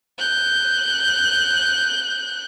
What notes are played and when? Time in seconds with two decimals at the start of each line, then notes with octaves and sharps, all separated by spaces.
0.18 F#6 G6